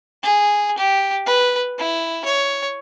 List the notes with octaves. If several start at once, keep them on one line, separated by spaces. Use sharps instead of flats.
G#4
G4
B4
E4
C#5